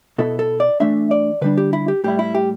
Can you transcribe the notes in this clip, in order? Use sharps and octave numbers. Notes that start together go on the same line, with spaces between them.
B2 B3 E4 A4
A4
D5
E3 A3 D4 E5
D5
D3 G3 D4 B4
G4
E4
G4
A2 G3 E4 G4
E4
G4